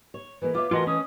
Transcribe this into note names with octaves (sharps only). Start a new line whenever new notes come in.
C#5
E3 G#3 A#3 B4
F4 C#5 E5 D6
E3 A3 F4 F#4 A#4 D#5 C6
C#4 D#6